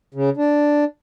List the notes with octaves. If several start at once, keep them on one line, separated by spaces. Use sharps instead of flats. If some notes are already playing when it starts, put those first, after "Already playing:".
C#3
D4